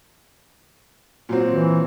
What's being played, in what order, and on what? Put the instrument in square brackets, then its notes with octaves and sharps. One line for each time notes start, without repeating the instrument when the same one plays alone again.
[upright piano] A#2 F#3 C4
[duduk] E3